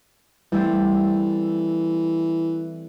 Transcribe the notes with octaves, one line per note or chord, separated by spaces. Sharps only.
E3 G3 A3 C4